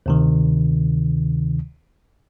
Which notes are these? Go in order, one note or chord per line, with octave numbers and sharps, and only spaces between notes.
D2 C3 D#3